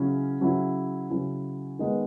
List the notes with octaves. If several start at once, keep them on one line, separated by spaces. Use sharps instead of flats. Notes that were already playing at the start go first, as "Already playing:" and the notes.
Already playing: C#3 F#3 C#4 E4
C#3 F#3 C#4 E4
C#3 F#3 C#4 E4
D#3 G#3 B3 D#4